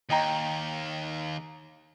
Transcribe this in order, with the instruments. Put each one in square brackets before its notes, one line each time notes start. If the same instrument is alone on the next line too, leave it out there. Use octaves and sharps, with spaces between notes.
[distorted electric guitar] D#2 [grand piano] D#5 G5 A#5